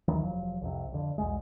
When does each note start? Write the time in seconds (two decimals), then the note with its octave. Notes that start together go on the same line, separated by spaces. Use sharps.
0.08 D#2 D#3 E3 F#3
0.23 F1 F3 F#3
0.61 C2 F2 C3
0.92 F2 D3
1.18 B1 E2 G#3